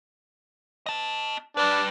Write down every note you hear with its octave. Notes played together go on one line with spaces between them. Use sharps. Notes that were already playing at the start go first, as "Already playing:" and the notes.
D#5 A5
G3 D4 B4